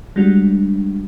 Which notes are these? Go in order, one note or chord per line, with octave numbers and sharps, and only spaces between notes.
G3 G#3 D4 F#4